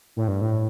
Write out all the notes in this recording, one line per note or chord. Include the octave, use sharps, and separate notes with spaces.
A2
G2
A2